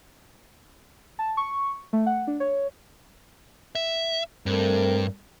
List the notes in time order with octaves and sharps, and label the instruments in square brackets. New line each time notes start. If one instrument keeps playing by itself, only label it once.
[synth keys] A5
C#6
A3
F#5
D4
C#5
[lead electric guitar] E5
[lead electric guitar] G2 [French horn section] A3 C4 A#4